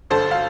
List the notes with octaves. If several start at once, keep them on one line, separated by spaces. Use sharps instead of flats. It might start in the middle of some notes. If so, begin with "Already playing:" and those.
G1 G2 D3 A4 C5
F5